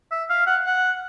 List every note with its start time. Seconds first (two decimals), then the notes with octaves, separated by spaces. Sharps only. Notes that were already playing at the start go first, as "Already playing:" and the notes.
0.11 E5
0.29 F5
0.47 F#5
0.65 F#5